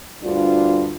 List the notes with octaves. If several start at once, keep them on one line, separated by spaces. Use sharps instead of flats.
D2 G2 D4 F4